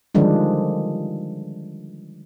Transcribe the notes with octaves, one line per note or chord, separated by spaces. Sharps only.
D3 D#3 F3 G3 G#3 D4